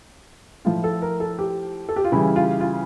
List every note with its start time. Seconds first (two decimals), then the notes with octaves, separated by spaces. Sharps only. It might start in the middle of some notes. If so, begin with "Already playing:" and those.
0.65 A2 F3 F4
0.84 A4
1.02 A#4
1.20 A4
1.39 G4
1.89 A4
1.96 G4
2.04 F4
2.12 C#3 E3 G3 E4
2.36 F4
2.60 F4